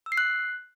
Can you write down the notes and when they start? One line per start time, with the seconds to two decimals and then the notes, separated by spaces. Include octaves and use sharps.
0.06 E6
0.12 C7
0.18 F#6